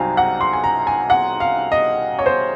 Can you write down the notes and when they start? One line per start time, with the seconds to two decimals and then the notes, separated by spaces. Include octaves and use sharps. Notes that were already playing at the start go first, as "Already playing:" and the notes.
Already playing: C2 C3 F#3 C4 D#4 F5 G#5 A#5
0.17 F#5
0.41 C6
0.53 G#5
0.64 A#5
0.87 G#5
1.10 F#5
1.40 F5
1.72 D#5
2.19 C#5
2.26 C5